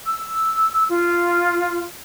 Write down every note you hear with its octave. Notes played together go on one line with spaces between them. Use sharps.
E6
F4